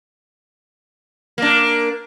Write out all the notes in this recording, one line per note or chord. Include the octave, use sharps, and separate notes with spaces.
A#3 D4